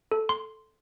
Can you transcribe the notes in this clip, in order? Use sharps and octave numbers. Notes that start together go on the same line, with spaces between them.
A4
C6